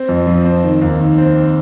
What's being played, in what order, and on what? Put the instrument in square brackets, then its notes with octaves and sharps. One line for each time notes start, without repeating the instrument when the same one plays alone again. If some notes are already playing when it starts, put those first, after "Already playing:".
Already playing: [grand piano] C4
F2
F3
C4
D#3
D#2
D#3
C4